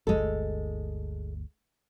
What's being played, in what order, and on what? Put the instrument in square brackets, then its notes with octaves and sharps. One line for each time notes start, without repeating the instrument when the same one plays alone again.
[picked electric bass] G1 D2 [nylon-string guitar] G#3 A4